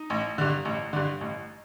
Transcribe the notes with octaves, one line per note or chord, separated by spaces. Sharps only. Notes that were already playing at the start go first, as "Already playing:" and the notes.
Already playing: D#4
A1
G2 D3
A1
G2 D3
A1